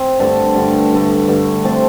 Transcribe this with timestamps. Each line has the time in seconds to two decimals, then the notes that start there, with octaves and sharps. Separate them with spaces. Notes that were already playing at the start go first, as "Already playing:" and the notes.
Already playing: C4
0.20 G2 D3 A3 A5
0.55 G2 D3 A3
0.91 G2 D3 A3
1.28 G2 D3 A3
1.64 F3 A3 C4 A5